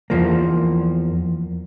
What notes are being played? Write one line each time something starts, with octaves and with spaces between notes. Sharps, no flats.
E2 F3 A#3